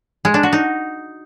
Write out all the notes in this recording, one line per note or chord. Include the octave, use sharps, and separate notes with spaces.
G#3
D4
F#4
D#4